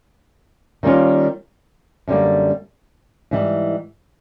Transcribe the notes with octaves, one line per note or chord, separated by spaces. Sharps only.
D#3 G3 A#3 C#4 F4
F#2 D3 G3 A#3
G#2 E3 G3